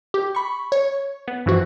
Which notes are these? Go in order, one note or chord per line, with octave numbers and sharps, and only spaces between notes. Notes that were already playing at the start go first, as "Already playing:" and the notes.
G4
B5 C#6
C#5
B3
G2 E3 F3 F#4